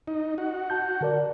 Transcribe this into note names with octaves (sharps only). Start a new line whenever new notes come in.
D#4
F#4
A5 G6
D3 A#4 D5